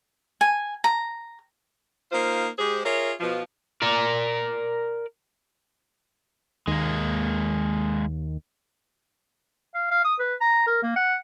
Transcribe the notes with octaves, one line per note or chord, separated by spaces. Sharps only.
G#5
A#5
A#3 D#4 F4 C5
G#3 G4 G#4 C5
F4 G#4 A#4 C#5 E5
B2 F3
A#4 D5
D#2 G#3 A#3
F5
F5
D#6
B4
A#5
A#4
A#3
F#5